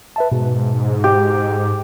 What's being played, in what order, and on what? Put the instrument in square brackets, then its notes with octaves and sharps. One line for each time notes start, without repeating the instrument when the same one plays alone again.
[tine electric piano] B4 E5 A5
[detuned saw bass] G#2 [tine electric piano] B2
[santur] G4 [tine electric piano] G6